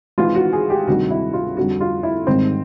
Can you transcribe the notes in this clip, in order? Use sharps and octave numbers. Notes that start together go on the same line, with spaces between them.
G#1 G#2 E3 F4
F#4
G#4
G4
D2 C3 D#3 G3 F#4
E4
F4
F2 D3 G3 F#4
F4
E4
G#1 G#2 D#3 G3 C4